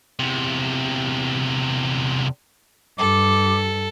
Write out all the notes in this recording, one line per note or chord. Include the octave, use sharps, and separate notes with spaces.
E2 C3
G2 A4 D6